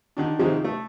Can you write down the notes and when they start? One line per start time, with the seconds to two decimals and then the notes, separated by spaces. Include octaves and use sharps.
0.17 D3 D#3 D4
0.39 G#2 C3 D#3 F3 G#3
0.64 A3